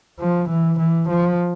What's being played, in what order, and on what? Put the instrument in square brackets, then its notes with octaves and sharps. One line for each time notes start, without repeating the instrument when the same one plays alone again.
[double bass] F3
E3
E3
F3